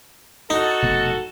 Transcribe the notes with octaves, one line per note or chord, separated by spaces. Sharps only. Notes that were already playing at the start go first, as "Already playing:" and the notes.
D#4 F#4 A4
F1 B2 A3